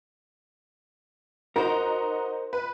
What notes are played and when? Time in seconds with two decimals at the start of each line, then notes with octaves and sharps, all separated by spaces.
1.56 D#4 F#4 A#4 C5 A#5
2.53 B4